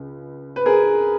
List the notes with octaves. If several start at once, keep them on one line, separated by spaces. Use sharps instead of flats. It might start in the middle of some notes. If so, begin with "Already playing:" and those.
Already playing: C#2 C#3
B4
G#4 A#4